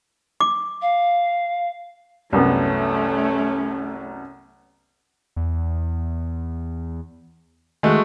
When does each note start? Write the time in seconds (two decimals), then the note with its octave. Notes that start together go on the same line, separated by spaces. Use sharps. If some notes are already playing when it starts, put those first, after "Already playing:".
0.41 D6
0.81 F5
2.33 C2 F#2 A3 B3 C#4
5.36 E2
7.83 D#3 G#3 A3 F#4